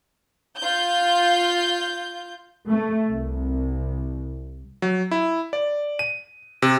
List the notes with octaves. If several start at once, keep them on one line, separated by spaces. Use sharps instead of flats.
F4 G6
A3
C2
F#3
E4
D5
D#7
C3